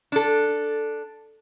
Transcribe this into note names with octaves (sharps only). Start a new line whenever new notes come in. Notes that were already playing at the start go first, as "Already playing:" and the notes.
D4 A4